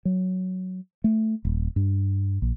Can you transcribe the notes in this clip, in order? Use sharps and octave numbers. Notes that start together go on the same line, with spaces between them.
F#3
A3
D#1
G2
A#1